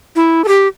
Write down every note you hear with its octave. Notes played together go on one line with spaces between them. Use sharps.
E4
A4
G4